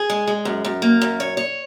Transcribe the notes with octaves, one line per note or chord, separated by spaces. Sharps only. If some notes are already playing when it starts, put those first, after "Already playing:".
Already playing: G#4
G#3
G#3
F#2
F#2
A#3
F#2
C#5
C#5